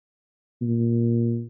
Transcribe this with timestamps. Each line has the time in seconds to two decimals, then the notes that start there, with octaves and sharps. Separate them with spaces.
0.62 A#2